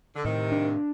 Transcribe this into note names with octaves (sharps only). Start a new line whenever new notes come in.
D3
A2 C3 D#3
D4